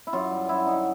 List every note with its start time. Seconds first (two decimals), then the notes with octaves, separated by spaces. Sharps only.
0.07 E4
0.13 F#2 F4
0.31 G3
0.49 F#2 E4
0.66 D3 D#4